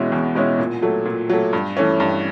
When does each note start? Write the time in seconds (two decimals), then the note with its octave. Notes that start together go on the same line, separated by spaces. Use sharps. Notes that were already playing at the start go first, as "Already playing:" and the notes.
Already playing: E2 B2 G#3 C#4 E4
0.12 E2
0.35 B2 G#3 C#4 E4
0.59 A#2
0.82 F#3 A3
1.05 A#2
1.30 F#3 A3
1.53 G2
1.77 E3 A3 C#4
2.00 G2